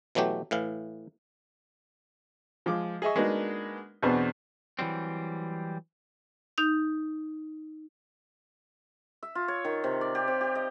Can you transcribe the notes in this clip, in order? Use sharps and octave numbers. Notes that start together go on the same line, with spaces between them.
B2 E3 F#3 A3 G4
A2 E3 F5
F3 G#3 D6
G#4 D#5 E5 C#6
G#3 A#3 B3 D4 D#4 F#4
E2 B2 B3 C4 D4
E3 F#3 G3 C4
D#4 G6
E5
F4
C#5
D#3
C3
D5
G4
C3
G4
D#5